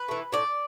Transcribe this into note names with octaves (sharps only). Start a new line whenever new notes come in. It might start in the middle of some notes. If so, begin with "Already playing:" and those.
Already playing: B4
E3 A3
A2 D5